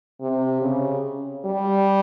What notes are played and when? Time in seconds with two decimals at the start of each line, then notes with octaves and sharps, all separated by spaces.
0.21 C3
0.62 C#3
1.45 G3